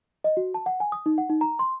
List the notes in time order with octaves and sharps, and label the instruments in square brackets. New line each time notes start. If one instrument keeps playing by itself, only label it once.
[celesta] D#5
F#4
A5
F#5
G#5
D#6
D#4
F#5
D#4
A#5
C6